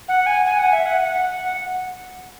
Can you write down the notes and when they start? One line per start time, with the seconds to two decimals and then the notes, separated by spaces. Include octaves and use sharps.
0.08 F#5
0.26 G#5
0.46 G#5
0.59 F#5
0.73 E5
0.86 F#5
1.02 F#5